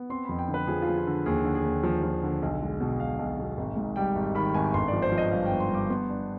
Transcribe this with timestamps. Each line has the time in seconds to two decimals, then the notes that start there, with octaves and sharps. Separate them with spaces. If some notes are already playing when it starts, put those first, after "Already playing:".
Already playing: B3
0.10 C4 C6
0.25 F2 B5
0.39 G5
0.48 D3
0.54 B4
0.67 F3 G#4
0.82 F4
0.88 F3
0.97 F4
1.07 D3
1.26 D#2 G#4
1.45 D3
1.55 G#4
1.65 D#2
1.83 F3
2.03 F3
2.23 D3
2.42 B1
2.62 G#3
2.80 B2
3.00 B1 F5
3.19 B1
3.39 B1
3.57 G#1
3.77 G#2
3.96 G3 G5
4.15 G#1
4.35 D#3 B5
4.54 G#1 G#5
4.73 G1 C6
4.88 D5
4.93 F3
5.02 C5
5.12 F3
5.18 D#5
5.32 G2 F5
5.46 G1 G5
5.60 C6
5.70 G2 D6
5.90 B3 C6
6.09 D4